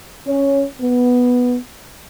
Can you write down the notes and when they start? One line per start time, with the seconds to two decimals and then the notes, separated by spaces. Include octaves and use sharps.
0.26 C#4
0.80 B3